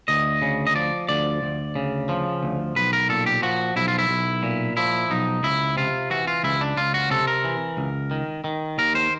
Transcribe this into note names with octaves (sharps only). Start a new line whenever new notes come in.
D2 D#5
C#3
D#5
F3 D5
D2 D5
D2
C#3
F3
D2
B1 B4
A#4
A#2 A4
G4
F3 F#4
B1 E4
F4
E4
B1
A#2
F3 E4
B1 D#4
C#2 E4
C3 F4
E3 F#4
F4
C#2 E4
D4
C#2 F4
F#4
C3 A4
A#4
E3
C#2
D#3
D#3
D#2 A#4
C5